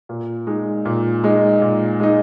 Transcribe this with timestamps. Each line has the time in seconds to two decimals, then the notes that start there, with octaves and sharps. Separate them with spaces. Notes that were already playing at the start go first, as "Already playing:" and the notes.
0.09 A#2
0.47 G#3 D#4
0.85 A#2
1.24 G#3 D#4
1.62 A#2
2.00 G#3 D#4